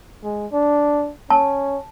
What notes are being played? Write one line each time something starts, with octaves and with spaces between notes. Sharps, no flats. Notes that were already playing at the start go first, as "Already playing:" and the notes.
G#3
D4
C#4 A5